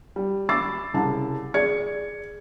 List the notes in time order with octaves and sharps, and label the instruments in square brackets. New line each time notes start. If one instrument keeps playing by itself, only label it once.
[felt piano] G3
B5 D6 E6 A6 C7
C2 C#3 A5
G#4 D5 G#6 C#7